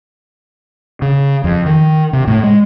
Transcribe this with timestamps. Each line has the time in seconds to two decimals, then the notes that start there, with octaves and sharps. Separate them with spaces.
1.02 C#3
1.44 F2
1.66 D#3
2.13 C3
2.28 A2
2.44 G#3